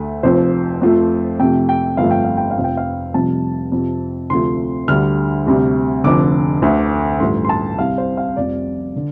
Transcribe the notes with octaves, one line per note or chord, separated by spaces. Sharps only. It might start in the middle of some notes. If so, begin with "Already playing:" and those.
Already playing: D2 A3
F1 F2 F3 C5
F2 F3 A3
F2 C3 A3 G5
G5
G1 F2 F3 A3 F5
G5
F5
G5
F5
F1 F2 F3
G5
F5
F1 F2 C3 G3 A5
F2 C3 F3
D2 C3 F3 A3 C6
D2 D3 G3 F6
D2 C3 G3
F1 F2 D3 D6
D2 D3 A3
A1 G2 F3 A3 C6
C6
A5
C2 C3 G3 F5
C5
F5
F1 F2 C3 G3 D5
D3